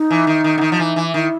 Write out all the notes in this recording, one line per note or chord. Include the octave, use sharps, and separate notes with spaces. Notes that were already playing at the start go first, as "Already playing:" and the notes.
Already playing: D#4
E3
D#3
D#3
D3
D#3
F3
E3
E3
D#3 E4